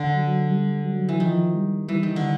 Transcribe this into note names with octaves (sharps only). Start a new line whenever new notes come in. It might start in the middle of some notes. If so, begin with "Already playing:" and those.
Already playing: D3
F#3
G3
F#3
E3
D#3 F3
G3
E3 G3
D#3
D3